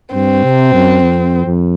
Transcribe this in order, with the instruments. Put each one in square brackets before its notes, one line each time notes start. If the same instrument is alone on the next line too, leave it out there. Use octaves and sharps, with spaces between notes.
[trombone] G2 [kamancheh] C4
[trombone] C3
F#2
F2
F2